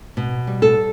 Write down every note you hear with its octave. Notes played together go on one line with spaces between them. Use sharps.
B2
G3
A4